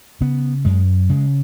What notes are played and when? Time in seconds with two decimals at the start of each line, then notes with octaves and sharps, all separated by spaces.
0.21 C#3 B3
0.65 F#2 G#3
1.09 C#3 G#3